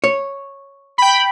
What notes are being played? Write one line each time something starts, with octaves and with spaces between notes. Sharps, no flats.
C#5
G5 B5